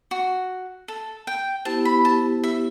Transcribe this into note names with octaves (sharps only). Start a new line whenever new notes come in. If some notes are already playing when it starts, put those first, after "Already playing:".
F#4
A4
G5
B3 E4 G4 C5 A5
B5
A5
E5